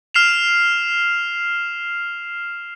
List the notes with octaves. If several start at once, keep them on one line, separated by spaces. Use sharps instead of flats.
F6 C7 E7 F7